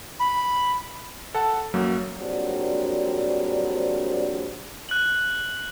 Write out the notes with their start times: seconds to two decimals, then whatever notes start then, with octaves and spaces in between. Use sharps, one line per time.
0.20 B5
1.35 A4 F#5 A5
1.74 F#2 F#3 A#3
2.18 A#1 F#3 G3 C4 D4
4.89 F#6 F#7